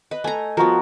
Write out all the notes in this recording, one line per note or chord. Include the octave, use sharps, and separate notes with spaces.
B4 D#5
A3 G#5 A#5
F3 B3 F#4 A#4